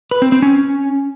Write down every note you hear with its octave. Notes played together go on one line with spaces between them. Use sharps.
B4
C4
C4
C#4